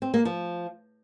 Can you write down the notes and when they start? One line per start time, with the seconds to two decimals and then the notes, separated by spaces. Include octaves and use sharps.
0.02 C4
0.14 A#3
0.25 F3